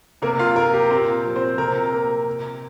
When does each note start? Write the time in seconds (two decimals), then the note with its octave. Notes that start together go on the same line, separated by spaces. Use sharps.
0.22 C3 A#3 A#4
0.39 F4 F5
0.56 A#3 A#4 A#5
0.73 G4
0.90 A#2 C4 C5
1.25 F3 C4
1.36 C4 C5
1.58 C3 A#4 A#5
1.93 A#3
2.27 C3